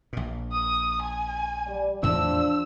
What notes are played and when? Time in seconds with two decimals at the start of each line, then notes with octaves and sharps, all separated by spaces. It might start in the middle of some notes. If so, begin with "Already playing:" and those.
0.13 A#1 A#2
0.52 D#6
1.02 G#5
1.67 G3 D5
2.03 E2 A2 F3 A3 D4 E6